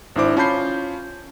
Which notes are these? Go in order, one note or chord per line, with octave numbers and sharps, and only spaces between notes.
G#1 D4 E4 C5 D6
C#4 F4 A5 B5 G6 C7